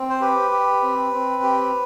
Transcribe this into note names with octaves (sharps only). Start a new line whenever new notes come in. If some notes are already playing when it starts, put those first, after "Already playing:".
Already playing: C4
C5
G4 B4
G4
C4
C4
G4